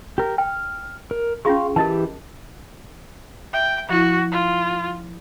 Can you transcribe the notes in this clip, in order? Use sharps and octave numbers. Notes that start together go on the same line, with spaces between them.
G4 A#4
G5 F6
A#4
C#4 F4 G#4 F5 C6 C#6
E3 G4 A#4 D#5 A5
E5 G5
F3 E4 F#4
F4